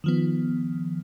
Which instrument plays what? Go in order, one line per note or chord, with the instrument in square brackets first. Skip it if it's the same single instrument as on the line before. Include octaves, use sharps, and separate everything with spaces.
[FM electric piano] D#3 F3 B3